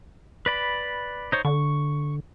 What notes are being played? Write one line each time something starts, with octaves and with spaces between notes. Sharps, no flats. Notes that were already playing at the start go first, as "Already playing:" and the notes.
B4 D5 B5
D#4 C5 C#5
D3 C#6